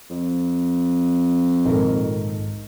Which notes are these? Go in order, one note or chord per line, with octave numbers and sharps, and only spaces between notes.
F2
A#1 G#2 D#3 A4 A#4